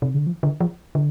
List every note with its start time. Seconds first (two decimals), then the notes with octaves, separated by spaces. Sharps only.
0.02 C3
0.14 D3
0.27 F3
0.43 D3
0.61 F3
0.95 D3